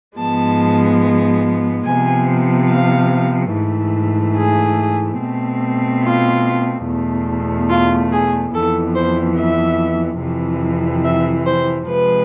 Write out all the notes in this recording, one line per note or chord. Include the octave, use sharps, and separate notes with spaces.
G#2 F3 G#3 B3 A5
C3 F3 B3 G#5
F5
G#2 E3 A3
G#4
B2 A3 C4
F4
E2 B2 A3
F4
G#4
F2 E3 B3 A4
C5
E5
F2 C3 E3
E5
C5
C3 F3 G#3 B4